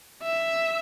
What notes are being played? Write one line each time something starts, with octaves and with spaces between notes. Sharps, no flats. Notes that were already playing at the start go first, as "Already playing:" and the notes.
E5